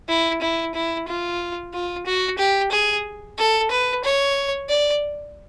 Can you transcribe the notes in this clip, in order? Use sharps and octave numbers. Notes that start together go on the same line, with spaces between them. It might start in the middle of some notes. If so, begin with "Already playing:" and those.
E4
E4
E4
F4
F4
F#4
G4
G#4
A4
B4
C#5
D5